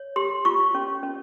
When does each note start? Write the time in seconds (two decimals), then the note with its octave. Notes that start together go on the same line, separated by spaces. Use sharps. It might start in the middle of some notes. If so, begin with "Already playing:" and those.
Already playing: C#5
0.16 G4 C6
0.45 F4 C#6
0.75 C#4
1.03 C#4